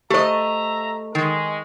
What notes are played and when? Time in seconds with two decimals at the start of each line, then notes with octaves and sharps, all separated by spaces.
0.10 A3 G4 C5 D#5 E5 A#5
1.15 D#3 G#3